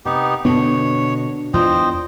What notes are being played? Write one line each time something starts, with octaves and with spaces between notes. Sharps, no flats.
C3 B3 D#4 G4
B2 D3 B3 D4 C#5
E2 E3 D4 F4 C5 D#5 G5